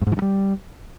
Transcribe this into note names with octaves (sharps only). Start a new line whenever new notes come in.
G2
G#2
E3
G2
G3